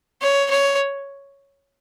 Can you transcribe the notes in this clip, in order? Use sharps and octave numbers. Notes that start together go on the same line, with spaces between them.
C#5
C#5